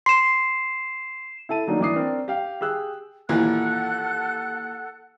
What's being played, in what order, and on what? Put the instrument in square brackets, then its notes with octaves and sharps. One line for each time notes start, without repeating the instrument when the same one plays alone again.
[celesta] C6 [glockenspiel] C7 E7
[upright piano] E4 A4 A5 D#7
D#3 F#3 A3 A#3 D4 D#4
E3 D4 D6 D#6 C7
C4 D4 A#4 D5
G4 F5 G5
G4 G#4 E6 F#6
[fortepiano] D#2 A#2 E3 [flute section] A4 F#5 F#6